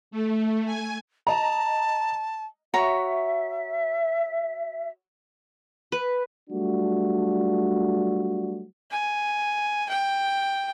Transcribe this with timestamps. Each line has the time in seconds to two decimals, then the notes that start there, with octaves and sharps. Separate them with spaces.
0.11 A3
0.65 G#5
1.27 D#5 A5 A#5
2.74 F#4 C#5 E5 A#5
5.92 B4
6.50 F#3 G3 A3 D4 F4 F#4
8.91 G#5
9.90 G5